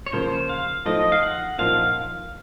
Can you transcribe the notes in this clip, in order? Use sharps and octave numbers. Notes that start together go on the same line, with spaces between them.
C#5
C#3 F3 A#3 C5
F5
F3 A3 D#4 D#5
F5
F#5
A#2 F3 A#3 D#4 F5